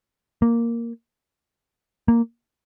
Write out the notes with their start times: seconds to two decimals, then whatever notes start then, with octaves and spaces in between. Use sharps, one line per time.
0.42 A#3
2.08 A#3